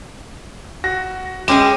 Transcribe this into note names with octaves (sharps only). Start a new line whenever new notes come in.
F#4 A#6
G#3 C#4 G#4 G5 D6 E7